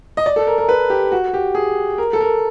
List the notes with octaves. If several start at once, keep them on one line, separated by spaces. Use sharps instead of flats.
D#5
D5
A4
A#4
A#4
B4
G4
F#4
G4
G#4
A#4
A4
A#4